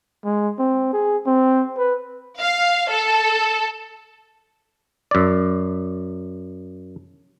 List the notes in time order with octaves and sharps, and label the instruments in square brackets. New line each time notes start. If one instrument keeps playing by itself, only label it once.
[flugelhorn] G#3
C4
G#4
C4
B4
[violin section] F5
A4
[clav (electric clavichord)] F#2 D5